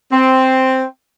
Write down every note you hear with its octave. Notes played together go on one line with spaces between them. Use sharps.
C4